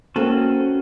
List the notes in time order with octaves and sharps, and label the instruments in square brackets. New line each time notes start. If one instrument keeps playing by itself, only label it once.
[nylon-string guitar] A#3 C4 A4 [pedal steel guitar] C#4 F#4 A5